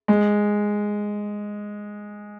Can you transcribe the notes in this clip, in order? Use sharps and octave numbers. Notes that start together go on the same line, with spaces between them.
G#3